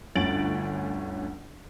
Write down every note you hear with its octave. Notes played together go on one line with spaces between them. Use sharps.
G1 D2 C#4 A6 D7 F#7